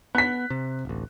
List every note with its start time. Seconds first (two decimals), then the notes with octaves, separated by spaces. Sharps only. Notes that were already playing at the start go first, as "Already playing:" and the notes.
0.15 B3 F#6 B6
0.50 C3
0.85 D1 A1